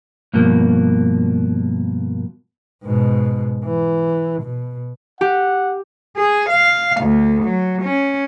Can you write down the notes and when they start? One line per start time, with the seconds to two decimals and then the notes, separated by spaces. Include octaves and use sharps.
0.33 G2 B2 F3 A#3
2.84 G#2 B2
3.64 E3
4.42 B2
5.21 G4 F#5
6.17 G#4
6.50 F5
7.02 D2
7.44 F#3
7.83 C#4